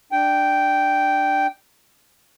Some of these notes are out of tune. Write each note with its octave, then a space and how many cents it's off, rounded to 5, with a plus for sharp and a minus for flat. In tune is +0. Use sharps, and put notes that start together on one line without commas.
D4 +15 G5 -5